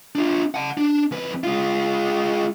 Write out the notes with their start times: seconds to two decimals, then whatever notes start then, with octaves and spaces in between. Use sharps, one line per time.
0.15 D4 F4
0.54 F#5 A5
0.77 D4
1.12 F2 B4
1.44 G#3 F4